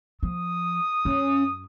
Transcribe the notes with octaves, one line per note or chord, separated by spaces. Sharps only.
F3 D#6
F#2 C#4